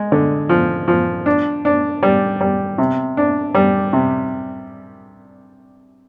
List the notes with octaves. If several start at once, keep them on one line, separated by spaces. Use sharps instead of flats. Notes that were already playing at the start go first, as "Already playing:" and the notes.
Already playing: G#3
D3
F3
F3
D4
D4
G3
G3
C3
D4
G3
C3